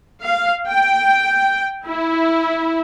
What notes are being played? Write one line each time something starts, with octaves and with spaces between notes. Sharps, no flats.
F5
G5
E4